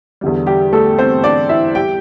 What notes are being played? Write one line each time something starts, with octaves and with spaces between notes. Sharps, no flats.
E2 D3 G3
G3 G4
A3 A4
C4 C5
D4 D5
E4 E5
G3 G4 G5